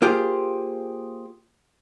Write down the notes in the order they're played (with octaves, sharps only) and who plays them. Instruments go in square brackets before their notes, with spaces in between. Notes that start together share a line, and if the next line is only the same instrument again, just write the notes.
[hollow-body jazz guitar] A#3 F4 G4 G#4 C5